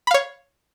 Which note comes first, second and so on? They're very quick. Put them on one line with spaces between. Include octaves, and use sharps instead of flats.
B5 F5 C#5